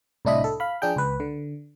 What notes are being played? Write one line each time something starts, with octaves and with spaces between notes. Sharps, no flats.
C2 A2 D4 E4 D#5 B5
A4
F5 B5
F3 D4 G#4 G5
C#2 B4
D3